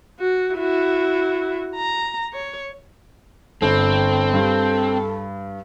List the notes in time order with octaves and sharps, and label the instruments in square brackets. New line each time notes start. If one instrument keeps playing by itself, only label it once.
[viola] F#4
E4 F#4
A#5
C#5
[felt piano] G1 [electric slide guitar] C4 [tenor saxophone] A4
[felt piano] G2